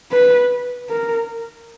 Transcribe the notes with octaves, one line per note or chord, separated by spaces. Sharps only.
B4
A#4